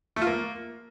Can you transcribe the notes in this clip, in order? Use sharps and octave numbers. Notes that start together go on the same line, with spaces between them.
A3
F4
A#3